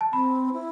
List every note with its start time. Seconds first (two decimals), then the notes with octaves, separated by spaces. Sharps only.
0.01 A5
0.13 C4 B5
0.53 E4